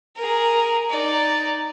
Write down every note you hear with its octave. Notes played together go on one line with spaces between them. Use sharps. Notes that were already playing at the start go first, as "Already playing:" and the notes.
G#4 A#4
D#4 D5